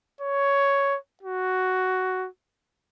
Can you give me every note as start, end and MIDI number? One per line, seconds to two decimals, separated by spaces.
0.21 0.98 73
1.23 2.28 66